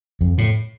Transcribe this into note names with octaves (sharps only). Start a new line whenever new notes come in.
F2
A2